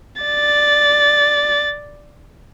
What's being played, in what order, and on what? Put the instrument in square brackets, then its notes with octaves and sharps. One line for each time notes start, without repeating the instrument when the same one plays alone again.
[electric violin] D5 A6